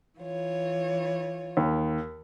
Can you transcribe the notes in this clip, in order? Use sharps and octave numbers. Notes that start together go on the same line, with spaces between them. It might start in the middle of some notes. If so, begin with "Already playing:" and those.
E3 F4 C#5
D#2